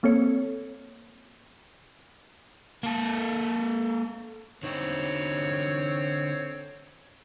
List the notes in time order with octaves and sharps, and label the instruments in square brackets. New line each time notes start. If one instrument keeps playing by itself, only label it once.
[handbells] A#3 C4 A4 C#5 C#7
[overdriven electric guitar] A#3 A4
[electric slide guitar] D3 D#4 C5 [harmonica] C4 C#5